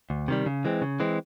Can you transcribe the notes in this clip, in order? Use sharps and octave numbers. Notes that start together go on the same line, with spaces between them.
D2
C3 D#3 G3
C#3
E3 G#3 C4
C#3
E3 G#3 C4